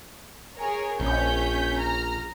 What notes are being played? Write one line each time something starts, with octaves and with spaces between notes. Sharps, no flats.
G#4 A#4 C#5
A#1 C#4 G6 B6
A#5 F6